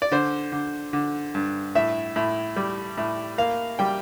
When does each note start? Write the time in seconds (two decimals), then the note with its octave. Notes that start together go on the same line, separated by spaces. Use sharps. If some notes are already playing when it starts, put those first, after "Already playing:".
0.02 D5
0.12 D3 C5
0.52 D3
0.93 D3
1.35 G2
1.75 A2 E5
2.16 A2
2.56 G3
2.97 A2
3.38 A#3 F5
3.79 G3 G5